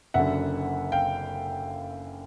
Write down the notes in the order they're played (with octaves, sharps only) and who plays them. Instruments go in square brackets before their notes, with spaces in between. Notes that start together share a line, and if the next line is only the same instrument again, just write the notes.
[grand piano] F#1 F#2 D3 E5 F#5
F5 G5